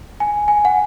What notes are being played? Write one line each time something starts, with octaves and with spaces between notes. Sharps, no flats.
G#5
G#5
F#5